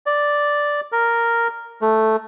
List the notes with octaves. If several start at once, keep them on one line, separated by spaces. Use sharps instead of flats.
D5
A#4
A3